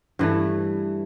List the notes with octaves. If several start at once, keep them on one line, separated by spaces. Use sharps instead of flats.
G2 E3 A3